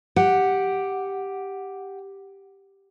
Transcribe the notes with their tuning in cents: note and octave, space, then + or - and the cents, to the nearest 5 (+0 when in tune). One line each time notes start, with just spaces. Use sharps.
G4 +0 F#5 +0